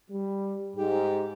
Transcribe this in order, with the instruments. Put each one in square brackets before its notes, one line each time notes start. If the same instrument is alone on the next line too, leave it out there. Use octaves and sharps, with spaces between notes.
[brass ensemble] G3
[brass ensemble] G#2 [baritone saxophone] G4